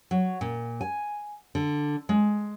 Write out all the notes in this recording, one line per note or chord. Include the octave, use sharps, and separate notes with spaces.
F#3
A#2
G#5
D3
G#3